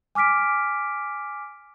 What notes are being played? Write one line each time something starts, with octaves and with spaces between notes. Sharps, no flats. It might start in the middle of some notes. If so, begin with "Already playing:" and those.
G#5 D6 F6 B6 D7